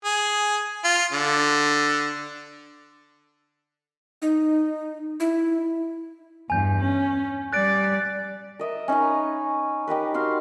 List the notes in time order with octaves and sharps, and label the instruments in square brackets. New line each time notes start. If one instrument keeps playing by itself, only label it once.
[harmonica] G#4
F4
D3
[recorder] D#4
E4
[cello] E2 G2 [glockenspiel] G#5 G6
[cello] C#4
[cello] G3 D5 [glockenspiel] F#6 A6 D7
[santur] A#4 D#5 E5
C#4 D#4 B4 A#5
D#4 G4 A#4 B4
F#4 F5 C6